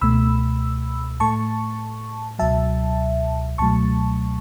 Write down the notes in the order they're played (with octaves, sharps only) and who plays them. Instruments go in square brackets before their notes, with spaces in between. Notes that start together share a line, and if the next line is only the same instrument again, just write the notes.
[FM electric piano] C#2 B2 A3 B5 E6
A2 A3 A5 C#6
C#2 B2 F#3 E5 A5
C#2 B2 F#3 A3 A5 C#6